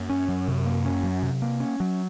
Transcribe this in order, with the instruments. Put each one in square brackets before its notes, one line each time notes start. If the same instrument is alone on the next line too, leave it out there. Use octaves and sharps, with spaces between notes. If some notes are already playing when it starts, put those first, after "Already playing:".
Already playing: [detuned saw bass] F#2 [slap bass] A#3
[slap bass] C#4
F#3
C3
A#3
C#4
F#3
C3
A#3
C#4
F#3